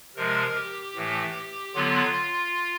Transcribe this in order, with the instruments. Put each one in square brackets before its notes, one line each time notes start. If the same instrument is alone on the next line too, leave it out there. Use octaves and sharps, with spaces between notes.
[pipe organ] C3 F3 G#3 A#4
G4
A2 E3 A3
D3 F#3 B3 F4